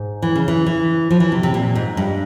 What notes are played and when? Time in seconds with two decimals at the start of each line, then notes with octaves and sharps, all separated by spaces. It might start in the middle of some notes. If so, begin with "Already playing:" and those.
Already playing: G#2
0.22 E3
0.35 C#3
0.48 E3
0.66 E3
1.11 F3
1.20 E3
1.32 C3
1.43 C3
1.54 A#2
1.75 G#2
1.97 G2